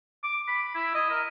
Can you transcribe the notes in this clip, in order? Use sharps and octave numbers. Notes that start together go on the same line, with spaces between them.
D6
B5
E4
D#5
A#4